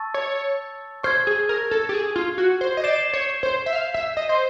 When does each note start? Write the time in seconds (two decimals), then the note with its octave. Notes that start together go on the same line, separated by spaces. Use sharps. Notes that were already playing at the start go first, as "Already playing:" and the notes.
Already playing: A5 C#6 E6 A6
0.14 C#5
1.03 C5 C#6 F6 G#6
1.27 G#4
1.49 A#4
1.71 A4
1.89 G4
1.94 G#4
2.16 F4
2.38 F#4
2.61 C5
2.77 D#5
2.83 D5 G6 C7 E7 G7
3.13 C#5
3.43 C5
3.66 E5
3.73 F5
3.94 E5
4.17 D#5
4.29 C5